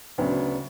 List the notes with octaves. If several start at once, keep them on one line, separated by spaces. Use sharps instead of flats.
D2 C#3 F#3 B3 D4